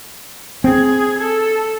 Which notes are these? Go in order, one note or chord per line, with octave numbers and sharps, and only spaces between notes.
C4 G#4 G#6
A4